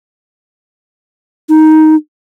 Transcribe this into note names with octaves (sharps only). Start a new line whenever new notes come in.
D#4